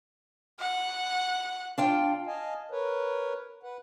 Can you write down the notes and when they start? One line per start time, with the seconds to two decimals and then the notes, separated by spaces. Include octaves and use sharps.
0.60 F#5
1.78 D4 F4 G5
2.27 D#5 F5 G#5 A5
2.71 A#4 B4 C#5
3.63 B4 F#5